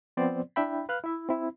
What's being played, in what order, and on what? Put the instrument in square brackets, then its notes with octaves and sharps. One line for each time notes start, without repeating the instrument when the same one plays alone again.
[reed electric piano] F3 B3 C4 C5 D5
D4 E4 E5 G5 B5
B4 F5 F6 F#6
E4 E5
C4 E4